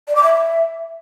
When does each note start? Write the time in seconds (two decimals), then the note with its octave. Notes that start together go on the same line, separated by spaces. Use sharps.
0.08 D5
0.15 D6
0.23 E5